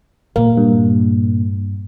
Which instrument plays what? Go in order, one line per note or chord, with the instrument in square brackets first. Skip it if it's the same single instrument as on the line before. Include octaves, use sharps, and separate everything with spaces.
[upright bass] A#2 [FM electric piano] A#3
[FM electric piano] G2